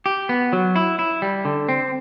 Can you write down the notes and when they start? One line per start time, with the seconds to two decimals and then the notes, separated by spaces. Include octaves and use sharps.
0.06 G4
0.29 B3
0.53 F#3
0.76 E4
0.99 E4
1.22 G3
1.45 D3
1.69 C4